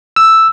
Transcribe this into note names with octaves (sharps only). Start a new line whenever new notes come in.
E6